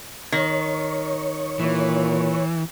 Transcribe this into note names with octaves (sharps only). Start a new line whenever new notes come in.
D#3 C#5
A#2 E3